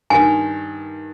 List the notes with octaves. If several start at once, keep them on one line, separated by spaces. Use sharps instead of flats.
G2 D#3 G#5